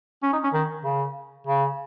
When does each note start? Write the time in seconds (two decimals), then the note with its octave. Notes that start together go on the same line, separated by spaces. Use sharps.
0.23 C#4
0.33 D#4
0.43 C#4
0.54 D#3
0.84 C#3
1.47 C#3